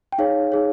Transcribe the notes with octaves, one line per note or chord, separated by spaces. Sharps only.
G5
D#4 G#4 C#5 F5
D#4 G#4 C#5